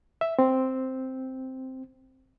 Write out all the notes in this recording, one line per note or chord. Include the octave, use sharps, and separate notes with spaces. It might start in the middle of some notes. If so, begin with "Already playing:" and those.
E5
C4